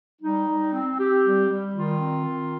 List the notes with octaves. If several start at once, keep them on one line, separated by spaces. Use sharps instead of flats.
G3 D#4
G3
C4
C4 G4
G3
G3
D#3 F4
C4
D#3